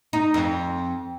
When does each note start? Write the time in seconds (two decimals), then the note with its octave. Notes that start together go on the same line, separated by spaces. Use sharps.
0.13 D#4
0.34 F2